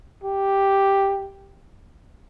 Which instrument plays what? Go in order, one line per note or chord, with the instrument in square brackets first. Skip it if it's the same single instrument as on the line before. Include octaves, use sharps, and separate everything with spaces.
[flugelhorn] G4